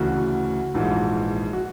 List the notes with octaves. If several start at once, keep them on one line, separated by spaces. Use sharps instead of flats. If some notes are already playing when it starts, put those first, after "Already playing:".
Already playing: D2 C#3 E3 F#4
A#1 G#2 E3
F#4